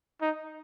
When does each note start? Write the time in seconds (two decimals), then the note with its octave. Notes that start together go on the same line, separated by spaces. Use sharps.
0.21 D#4